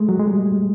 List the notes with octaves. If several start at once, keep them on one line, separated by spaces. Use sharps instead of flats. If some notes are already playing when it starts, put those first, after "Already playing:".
Already playing: G#3 A3
F#3
G#3
G3